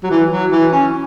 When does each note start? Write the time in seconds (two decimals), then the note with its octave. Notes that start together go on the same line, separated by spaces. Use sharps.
0.03 F#3
0.10 E3
0.31 F#3
0.52 E3
0.72 C#4